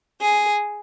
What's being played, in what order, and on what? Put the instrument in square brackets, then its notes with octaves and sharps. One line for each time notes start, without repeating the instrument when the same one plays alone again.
[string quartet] G#4